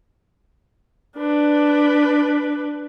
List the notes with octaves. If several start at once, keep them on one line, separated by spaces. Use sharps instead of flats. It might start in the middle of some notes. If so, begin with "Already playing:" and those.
D4 B4